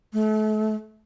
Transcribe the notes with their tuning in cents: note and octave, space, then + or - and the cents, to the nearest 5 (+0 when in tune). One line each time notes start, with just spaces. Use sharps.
A3 -35